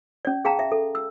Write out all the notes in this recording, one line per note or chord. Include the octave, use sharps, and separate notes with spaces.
C#4 D5
G#4 F5 G5 A5 A#5
E5
A4
E6